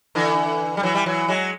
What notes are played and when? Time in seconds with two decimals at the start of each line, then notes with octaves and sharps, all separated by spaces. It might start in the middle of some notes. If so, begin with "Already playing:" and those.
0.15 D3 E3
0.77 G3
0.83 E3 F#3
0.95 G3
1.06 E3 F#3
1.28 F#3 G#3